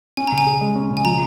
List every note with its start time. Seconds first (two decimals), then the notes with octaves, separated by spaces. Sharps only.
0.17 C#4 G#5
0.27 C#3 A#5
0.38 G#5
0.46 G#4
0.61 G#3
0.75 C#4
0.91 C#3
0.97 G#5
1.05 F3 A#5